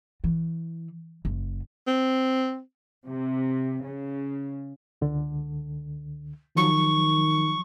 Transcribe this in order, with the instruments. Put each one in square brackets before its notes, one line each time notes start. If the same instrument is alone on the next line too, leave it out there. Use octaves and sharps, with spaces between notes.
[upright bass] E3
F#1
[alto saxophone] C4
[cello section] C3
C#3
[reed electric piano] C#2 D3
[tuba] D#3 [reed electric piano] F3 F#3 [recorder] C#6